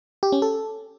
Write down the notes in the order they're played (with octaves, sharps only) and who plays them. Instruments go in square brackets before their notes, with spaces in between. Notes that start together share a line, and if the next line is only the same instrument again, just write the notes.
[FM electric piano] G4
C#4
A4